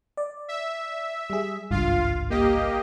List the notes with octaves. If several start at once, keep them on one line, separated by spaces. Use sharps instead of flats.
D5
E5
G3 G#4
G#1 C#2 G2 F4 F5
A#3 G4 D#5